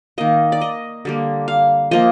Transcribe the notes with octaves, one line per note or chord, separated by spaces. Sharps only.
D#3 A#3 D#5
D5
D#5
D3 G3 A#3
F5
F3 A#3 D#5